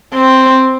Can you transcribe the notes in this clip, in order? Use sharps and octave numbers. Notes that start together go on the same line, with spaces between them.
C4